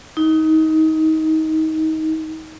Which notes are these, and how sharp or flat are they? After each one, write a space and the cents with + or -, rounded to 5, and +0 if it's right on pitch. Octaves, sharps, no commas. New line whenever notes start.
D#4 +25